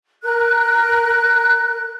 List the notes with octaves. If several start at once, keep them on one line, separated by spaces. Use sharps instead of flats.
A#4 F#6